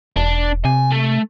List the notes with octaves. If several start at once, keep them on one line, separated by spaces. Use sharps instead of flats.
E1 D4
C3 G#5
A3